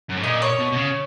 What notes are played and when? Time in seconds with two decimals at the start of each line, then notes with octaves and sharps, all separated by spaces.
0.10 F#2
0.17 G#2
0.24 A#2 D#5
0.42 C#5
0.59 B2
0.72 B2
0.76 C#3